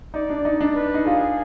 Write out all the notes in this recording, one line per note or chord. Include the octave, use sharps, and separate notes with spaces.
D#4 D5
D4
D#4
D4
B4
D#4
F4 G#4